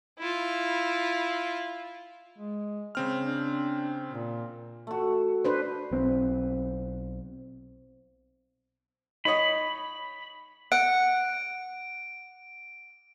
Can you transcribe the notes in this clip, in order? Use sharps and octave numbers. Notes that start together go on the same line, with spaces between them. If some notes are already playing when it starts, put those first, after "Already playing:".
E4 F4
G#3
C#3 C4 F6
D4
A#2
A3 F#4
D4 B4 C5
B1 C4
D#4 C#5 D#5 B5
F#5 D7